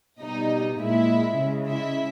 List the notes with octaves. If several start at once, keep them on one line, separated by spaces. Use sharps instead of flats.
B2 G3 D#4 D#5
A#2 G#3 E4 E5
C#3 G#3
E4 E5